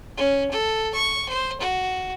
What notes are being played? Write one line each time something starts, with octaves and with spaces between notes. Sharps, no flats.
C#4
A4
C#6
C5
F#4